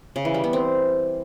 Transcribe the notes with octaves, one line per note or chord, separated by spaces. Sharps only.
C#3
E3
G3
B3
C4